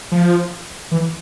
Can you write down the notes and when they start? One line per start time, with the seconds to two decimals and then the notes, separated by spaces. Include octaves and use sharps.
0.12 F3
0.92 E3